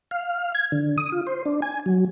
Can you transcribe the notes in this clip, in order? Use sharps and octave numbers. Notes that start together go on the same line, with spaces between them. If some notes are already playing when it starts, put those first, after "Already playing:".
F5
G#6
D3
D#6
F4
C5
D4
G#5
F#3